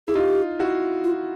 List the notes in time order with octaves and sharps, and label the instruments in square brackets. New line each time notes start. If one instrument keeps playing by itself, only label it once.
[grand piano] E4 [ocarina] G#4
[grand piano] D#4 F4 [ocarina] G4
[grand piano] E4 F#4
[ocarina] F4